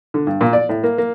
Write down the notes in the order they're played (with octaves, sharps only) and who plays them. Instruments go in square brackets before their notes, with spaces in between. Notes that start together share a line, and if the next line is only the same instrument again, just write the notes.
[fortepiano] D3
G2
A#2
D5
A2
A#3
A#3